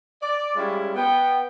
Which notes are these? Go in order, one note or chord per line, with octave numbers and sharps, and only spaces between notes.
D5
G3 G#3 C#4 E4 F4
B3 G5